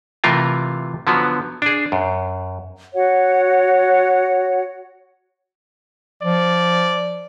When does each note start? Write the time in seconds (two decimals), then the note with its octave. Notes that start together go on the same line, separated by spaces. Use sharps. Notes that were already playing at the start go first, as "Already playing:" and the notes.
0.24 C3 E3 A3 F4 A#4
1.07 D3 F3 F#3 B3
1.62 D4 G#4
1.92 F#2
2.94 F#4 C#5 F#5
6.23 F3 D5